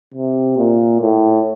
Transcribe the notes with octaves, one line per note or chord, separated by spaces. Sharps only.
C3
A#2
A2